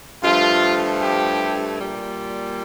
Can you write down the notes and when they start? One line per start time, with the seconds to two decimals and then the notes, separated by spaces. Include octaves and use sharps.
0.23 G2 F3 A3 F4
1.02 G4
1.80 A#2 G3